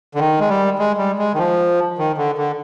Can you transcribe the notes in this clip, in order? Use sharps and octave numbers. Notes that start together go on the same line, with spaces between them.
D3
D#3
G#3
G3
G#3
G3
G#3
D#3
F3
D#3
D3
D3